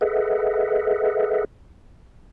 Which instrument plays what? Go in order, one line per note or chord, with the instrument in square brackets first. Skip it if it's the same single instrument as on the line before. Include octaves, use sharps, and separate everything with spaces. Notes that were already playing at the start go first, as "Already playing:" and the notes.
[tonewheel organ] G#4 A4 B4 D#5 E5 F#5